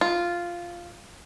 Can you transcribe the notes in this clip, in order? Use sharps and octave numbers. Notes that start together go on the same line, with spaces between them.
F4